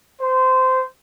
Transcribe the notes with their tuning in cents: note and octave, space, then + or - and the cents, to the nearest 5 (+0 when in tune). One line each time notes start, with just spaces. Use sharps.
C5 -20